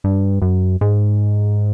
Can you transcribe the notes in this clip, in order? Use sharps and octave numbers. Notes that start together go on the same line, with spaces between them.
G2
F#2
G#2